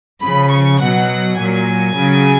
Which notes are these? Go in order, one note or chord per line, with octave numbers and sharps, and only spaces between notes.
C#3 F3 B5
C#6
B2 F#3 F#5
A#2 F#3 G#5
C#3 F#3